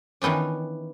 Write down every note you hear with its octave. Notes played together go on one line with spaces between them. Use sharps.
D#3 E3 B3 C#4 D4